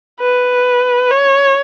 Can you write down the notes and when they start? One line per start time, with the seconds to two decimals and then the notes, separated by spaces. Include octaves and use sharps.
0.20 B4
1.11 C#5